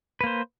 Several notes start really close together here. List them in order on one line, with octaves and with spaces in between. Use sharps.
B4 A#3 C5